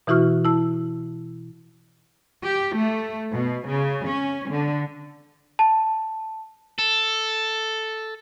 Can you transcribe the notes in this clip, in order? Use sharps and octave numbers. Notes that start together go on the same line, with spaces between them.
B2 E3 E4 F#4 C#6 F6
E4 A5 E6
G4
A3
B2
C#3
C#4
D3
A5
A4